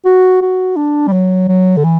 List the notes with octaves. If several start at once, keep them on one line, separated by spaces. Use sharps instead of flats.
F#4
F#4
D4
G3
F#3
F#3
D3
E3